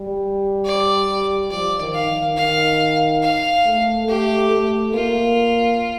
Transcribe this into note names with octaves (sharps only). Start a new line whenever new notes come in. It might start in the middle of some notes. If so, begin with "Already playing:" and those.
Already playing: G3
D5
F3 D5
D#3
F5
D#3
D#3 F5
F5
A3
A3 G4
A3
A#3 F4